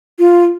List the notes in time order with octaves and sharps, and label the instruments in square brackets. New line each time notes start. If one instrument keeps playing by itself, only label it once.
[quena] F4